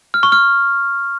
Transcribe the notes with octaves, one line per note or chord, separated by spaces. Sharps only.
F6
C#6
F6